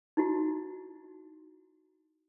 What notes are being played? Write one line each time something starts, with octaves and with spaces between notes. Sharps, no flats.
D#4 E4 F#4